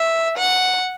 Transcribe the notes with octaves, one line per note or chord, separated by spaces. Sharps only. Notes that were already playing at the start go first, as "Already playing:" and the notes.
Already playing: E5
F#5